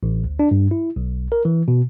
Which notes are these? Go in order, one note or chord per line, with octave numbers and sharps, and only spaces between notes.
A1
D2
D4
G2
E4
B1
A#4
E3
B2